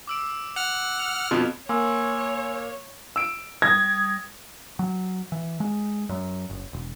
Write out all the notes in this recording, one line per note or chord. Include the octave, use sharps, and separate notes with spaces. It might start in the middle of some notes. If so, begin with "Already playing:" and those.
D6 E6 D7
F#5 F6 F7
F2 B2 F4
A#3 C#5 G#5 C6 E6
E6 D7
G3 D#6 G#6 A#6
F#3
E3
G#3
F#2
F#1
E1